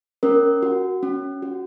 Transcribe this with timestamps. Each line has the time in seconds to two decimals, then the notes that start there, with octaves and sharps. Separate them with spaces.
0.23 C#4 A#4
0.63 F#4
1.03 C#4
1.42 F#4